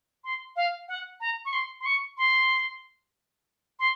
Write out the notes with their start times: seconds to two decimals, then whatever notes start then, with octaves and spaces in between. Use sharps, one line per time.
0.24 C6
0.56 F5
0.88 F#5
1.20 A#5
1.45 C#6
1.53 C6
1.80 C6
1.85 C#6
2.17 C6
3.79 C6